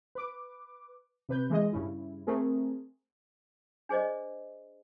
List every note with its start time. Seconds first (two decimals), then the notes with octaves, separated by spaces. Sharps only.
0.15 B4 D6
1.29 C3 B4 G6
1.50 E3 G#3 G#4 D#5
1.73 G2 C#3 E4
2.27 A3 C4 G#4 A#4
3.89 D4 G#4 C5 D5 D#5